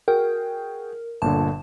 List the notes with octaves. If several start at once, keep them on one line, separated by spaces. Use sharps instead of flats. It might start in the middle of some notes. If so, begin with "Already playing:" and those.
F#4 G#4 A#4 G5
G1 A#2 D3 A5